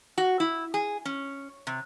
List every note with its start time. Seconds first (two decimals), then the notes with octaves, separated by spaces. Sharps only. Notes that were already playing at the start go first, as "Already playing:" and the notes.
0.18 F#4
0.40 E4
0.74 G#4
1.05 C#4
1.67 C3